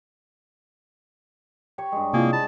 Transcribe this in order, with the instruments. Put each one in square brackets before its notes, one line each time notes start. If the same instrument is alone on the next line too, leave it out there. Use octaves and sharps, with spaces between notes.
[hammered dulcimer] G4 C#5 C#6
G2 G#3
[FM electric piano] C3 E4 F4 [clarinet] A#3 [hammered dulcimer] G#4
[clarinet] A5 [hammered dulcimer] B5